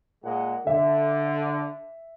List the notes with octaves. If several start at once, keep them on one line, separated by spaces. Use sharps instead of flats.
A#2 G#3 F#5
D3 E5